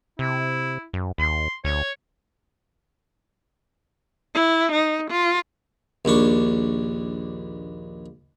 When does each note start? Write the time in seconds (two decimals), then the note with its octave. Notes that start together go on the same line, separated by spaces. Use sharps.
0.19 C3 E4
0.93 F#2
1.18 D#2 C6
1.65 D2 C#5
4.34 E4
4.72 D#4
5.11 F4
6.05 A#1 D#2 D4 C#6